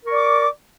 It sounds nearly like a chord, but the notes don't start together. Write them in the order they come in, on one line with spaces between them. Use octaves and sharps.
A#4 C#6 D5 D6